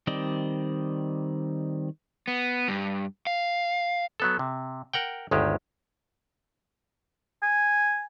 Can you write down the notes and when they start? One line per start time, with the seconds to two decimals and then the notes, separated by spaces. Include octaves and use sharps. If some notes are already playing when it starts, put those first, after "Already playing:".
0.07 D#3 G3 C4 D5 D#5
2.28 B3
2.68 G2
3.27 F5
4.20 F#3 B3 A4
4.39 C3
4.93 A#4 F#5 G5
5.31 G1 D2 D#3 G#3 G4
7.43 G#5